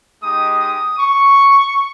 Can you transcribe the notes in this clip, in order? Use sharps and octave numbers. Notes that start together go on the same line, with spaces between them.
G#3 D#4 G4 D#6
D#6
C#6